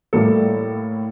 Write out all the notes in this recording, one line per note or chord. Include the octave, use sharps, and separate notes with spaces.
A2 G3 A#3 A4